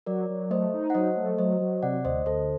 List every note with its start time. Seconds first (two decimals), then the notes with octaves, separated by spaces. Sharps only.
0.06 F#3 A#4 D5
0.29 F#3
0.50 A3 C5 D#5
0.73 D#4
0.90 F#5
0.95 F#3 C5 D#5
1.16 A3
1.39 F#3 C5 D#5
1.60 F#3
1.83 C3 D5 F#5
2.05 D2 C5 D#5
2.26 D2 A4 C5